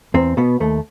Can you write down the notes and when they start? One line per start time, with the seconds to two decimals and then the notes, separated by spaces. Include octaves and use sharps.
0.14 E2 C4
0.37 B2 B3
0.60 D#2 A3